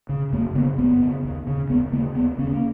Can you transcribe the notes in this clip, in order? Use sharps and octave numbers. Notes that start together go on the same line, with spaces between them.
C#3
F#2 A#3
C#3 B3
F#2 B3
C#3
D#2
C#3
D#2 B3
C#3 A#3
D#2 B3
C#3 C#4
A#3